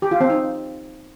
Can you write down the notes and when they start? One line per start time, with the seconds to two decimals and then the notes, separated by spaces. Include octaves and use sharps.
0.02 G4
0.11 F4
0.20 C4
0.30 D#4